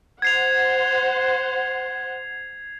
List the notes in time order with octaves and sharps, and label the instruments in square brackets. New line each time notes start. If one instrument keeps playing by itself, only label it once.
[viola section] C5 F#5 [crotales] G#6 C7 F7